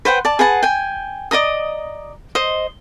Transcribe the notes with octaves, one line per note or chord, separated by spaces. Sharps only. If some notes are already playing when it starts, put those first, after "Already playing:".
B4 C5 F#5 G5
D5 A5
G#4 B4 F#5 A5
G5 G#5
D5 D#5 A#5 D#6
C5 D#5